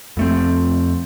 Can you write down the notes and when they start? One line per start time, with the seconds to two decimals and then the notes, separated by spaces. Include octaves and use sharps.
0.17 F2 A3 C4